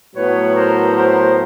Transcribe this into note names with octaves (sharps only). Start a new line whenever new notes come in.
A2 F#3 B3 B4 C#5
A#4 C5
A#4 C5